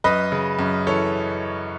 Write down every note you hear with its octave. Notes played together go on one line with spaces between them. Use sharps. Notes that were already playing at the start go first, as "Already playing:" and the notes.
F#2 B4 D#5
C#3
F#2
E3 A4 C#5